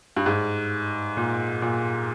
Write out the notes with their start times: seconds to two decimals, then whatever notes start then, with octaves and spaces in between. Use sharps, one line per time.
0.16 G2
0.26 G#2
1.17 A#2
1.62 A#2